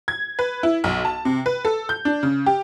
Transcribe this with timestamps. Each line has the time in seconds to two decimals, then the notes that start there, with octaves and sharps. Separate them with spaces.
0.08 G#6
0.39 B4
0.63 E4
0.84 B1
1.05 A5
1.25 C3
1.46 B4
1.65 A4
1.89 G6
2.05 D4
2.23 C#3
2.46 G4